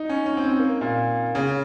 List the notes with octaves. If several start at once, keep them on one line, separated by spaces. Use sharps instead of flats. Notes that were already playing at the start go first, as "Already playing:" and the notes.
Already playing: D#4
C#4
C#4
C4
C4
A#3
A#2
C#3